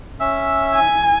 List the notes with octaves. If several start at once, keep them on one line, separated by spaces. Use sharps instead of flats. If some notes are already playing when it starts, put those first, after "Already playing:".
C#4 E5 E6
G#5